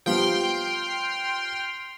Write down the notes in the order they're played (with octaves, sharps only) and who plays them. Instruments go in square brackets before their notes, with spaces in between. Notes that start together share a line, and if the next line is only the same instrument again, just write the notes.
[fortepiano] F3 G3 B3 [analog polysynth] G5 C6 F6